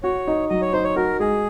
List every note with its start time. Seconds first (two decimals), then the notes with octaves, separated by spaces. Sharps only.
0.03 F#4 C#5
0.27 D#4
0.50 F#3 D#5
0.62 C#5
0.73 D#4 C5
0.84 C#5
0.96 F#4 A#4
1.20 G#3 G#4